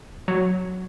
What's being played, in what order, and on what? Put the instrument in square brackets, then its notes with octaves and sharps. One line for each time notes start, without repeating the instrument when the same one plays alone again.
[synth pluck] F#3